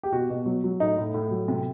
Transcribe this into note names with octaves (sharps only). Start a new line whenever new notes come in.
G4
B2 F#4
B2
F#3
F#3
A2 D#4
A2
A2
F#3
C3